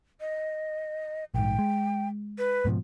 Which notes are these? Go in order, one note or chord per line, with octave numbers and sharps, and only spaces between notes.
D#5
A#1 G#2 G5
G#3
B4
G#2 B2 F3